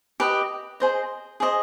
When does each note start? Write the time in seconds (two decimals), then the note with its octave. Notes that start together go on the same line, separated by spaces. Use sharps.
0.20 G4 B4 D#5
0.80 G#4 C5 D#5
1.40 G#4 C5 D#5